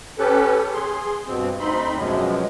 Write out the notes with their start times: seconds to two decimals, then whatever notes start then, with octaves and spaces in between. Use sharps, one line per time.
0.18 C#4 G4 A4 B4
0.73 G#4 C6
1.27 G2 B2 C4
1.60 D2 C4 D#4 B5 C6
1.96 F#2 B2 F3 F#3 G#3